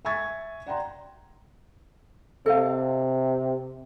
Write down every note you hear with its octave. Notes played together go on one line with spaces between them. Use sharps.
E5 G#5 C#6 G#6 A6 B6
D5 F#5 G5 A#5 C6
C3 A4 D#5 F5